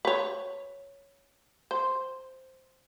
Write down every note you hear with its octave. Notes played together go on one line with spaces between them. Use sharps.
B4 C#5
C5